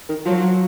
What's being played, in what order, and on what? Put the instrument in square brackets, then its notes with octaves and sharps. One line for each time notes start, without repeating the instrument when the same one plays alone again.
[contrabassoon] D#3
[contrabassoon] F3 [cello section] F#3